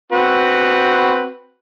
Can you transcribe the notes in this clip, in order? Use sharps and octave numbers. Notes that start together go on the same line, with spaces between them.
C4 F#4 B4